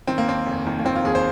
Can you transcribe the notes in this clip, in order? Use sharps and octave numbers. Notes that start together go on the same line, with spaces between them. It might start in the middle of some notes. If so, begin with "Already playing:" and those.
D#3 C4
A#3
D#2 C4
F1
D#3
A#3
D#3 C4
F4
D#2 G#4
C5